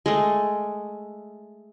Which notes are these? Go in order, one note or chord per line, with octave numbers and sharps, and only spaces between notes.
G#3 A3